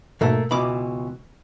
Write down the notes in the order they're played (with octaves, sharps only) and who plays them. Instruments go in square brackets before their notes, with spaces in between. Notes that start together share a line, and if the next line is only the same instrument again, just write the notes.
[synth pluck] G#2 B2 [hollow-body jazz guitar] A3 A#3
[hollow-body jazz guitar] C#2 B2 E3 [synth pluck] B5 D6